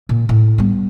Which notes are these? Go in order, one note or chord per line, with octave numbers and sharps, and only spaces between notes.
A#2
A2
G3 B3